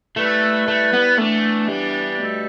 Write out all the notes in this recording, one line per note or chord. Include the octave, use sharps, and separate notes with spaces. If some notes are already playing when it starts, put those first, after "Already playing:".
G3 A3 E4 B4
A3
B3
E3 A3 B3 D4
G3
B2 A3 D4 A4